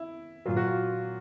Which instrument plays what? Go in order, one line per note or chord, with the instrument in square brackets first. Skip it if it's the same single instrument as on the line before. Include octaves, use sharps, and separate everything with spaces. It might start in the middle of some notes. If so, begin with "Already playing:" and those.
Already playing: [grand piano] E4
A#2 F#3 F4
F#4
F4